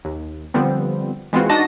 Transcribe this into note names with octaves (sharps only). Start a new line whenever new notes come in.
D#2
D3 F3 G3 B3 C4
E3 G#3 B3 C4 F4 F#4
D4 D#4 F#4 D#5 A5 A#6